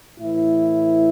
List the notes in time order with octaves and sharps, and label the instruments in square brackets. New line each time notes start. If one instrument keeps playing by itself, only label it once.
[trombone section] A2 E3 E4